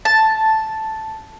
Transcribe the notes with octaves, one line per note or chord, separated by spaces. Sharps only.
A5